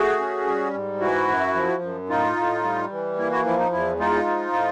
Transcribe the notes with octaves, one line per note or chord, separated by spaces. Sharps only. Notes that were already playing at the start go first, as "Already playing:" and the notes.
Already playing: A3 F#4 G#4
C#4
G3
G#2
E3 E4 F#4
F#2
F3
F#2
A2 D#4 F4
A2
G3
E3
A#3 E4
E4 F#4
F3 E4
D#4
E2 E4
G#3 D#4 F4
F3
A2